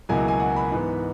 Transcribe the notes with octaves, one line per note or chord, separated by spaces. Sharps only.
C#2 B2 F#3 A#3 E4 G#5
G#5
F#5
B5
G#2 E3 B3